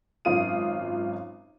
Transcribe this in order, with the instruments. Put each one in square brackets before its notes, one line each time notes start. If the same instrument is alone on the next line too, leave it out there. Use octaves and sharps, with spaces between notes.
[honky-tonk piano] G#1 F#2 F4 D#6 D#7